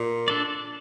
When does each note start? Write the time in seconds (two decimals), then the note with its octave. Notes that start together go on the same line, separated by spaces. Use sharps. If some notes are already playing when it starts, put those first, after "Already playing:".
Already playing: A#2
0.28 D4 A4 D5